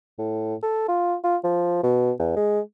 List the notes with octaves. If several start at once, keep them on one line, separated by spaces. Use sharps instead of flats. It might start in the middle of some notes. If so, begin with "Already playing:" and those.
A2
A4
F4
F4
F3
B2
E2
G#3